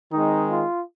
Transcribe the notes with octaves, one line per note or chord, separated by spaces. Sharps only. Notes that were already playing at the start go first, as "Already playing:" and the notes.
D#3 G#3 C4 D#4
F4